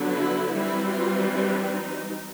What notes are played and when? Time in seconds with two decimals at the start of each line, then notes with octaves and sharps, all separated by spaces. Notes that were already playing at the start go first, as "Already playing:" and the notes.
Already playing: D3 F#3 B3 D4
0.15 E4
0.54 E3 G3 C4 E4
0.91 F4
1.30 D4
1.70 D#4